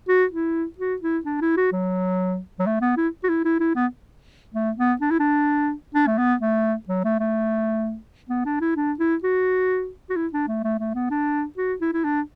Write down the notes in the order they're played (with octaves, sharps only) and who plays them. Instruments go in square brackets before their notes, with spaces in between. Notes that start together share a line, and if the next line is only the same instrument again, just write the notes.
[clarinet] F#4
E4
F#4
E4
D4
E4
F#4
F#3
F#3
A3
B3
E4
F#4
E4
E4
E4
B3
A3
B3
D4
E4
D4
D4
A3
B3
A3
F#3
A3
A3
B3
D4
E4
D4
E4
F#4
F#4
E4
D4
A3
A3
A3
B3
D4
F#4
E4
E4
D4